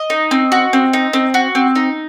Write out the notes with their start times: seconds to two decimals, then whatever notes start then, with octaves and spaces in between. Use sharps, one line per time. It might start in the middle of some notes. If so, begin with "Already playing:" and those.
Already playing: D#5
0.10 D#4
0.31 C4
0.52 F#4
0.73 C4
0.93 D#4
1.13 C4
1.34 F#4
1.55 C4
1.75 D#4